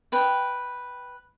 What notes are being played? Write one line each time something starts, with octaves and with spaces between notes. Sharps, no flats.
B4 G5